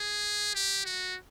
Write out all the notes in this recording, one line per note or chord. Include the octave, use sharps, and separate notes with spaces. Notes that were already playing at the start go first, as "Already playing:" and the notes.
Already playing: G#4
G4
F#4